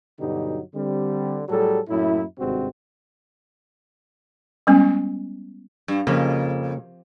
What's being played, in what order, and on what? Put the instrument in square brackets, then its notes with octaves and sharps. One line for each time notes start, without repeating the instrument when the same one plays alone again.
[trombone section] G2 B2 D3 F#3 D#4 G4
D3 G3 C4
A2 F#3 G3 G#4 A4
F#2 A2 F#3 A#3 E4
G#1 G2 C3 G#3 C4 F#4
[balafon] G3 G#3 B3 C#4
[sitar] G2
[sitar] F2 [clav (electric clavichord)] C#3 A#3